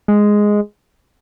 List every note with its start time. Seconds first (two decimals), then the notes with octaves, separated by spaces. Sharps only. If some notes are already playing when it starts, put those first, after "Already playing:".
0.08 G#3